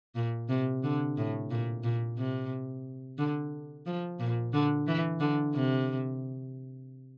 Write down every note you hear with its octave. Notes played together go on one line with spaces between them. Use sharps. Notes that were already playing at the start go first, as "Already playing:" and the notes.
A#2
C3
D3
A2
A#2
A#2
C3
D3
F3
A#2
D3
E3
D3
C3